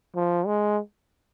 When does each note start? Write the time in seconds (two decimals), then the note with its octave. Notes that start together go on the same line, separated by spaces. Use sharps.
0.15 F3
0.46 G#3